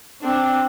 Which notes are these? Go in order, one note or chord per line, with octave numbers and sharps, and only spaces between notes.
C4 D4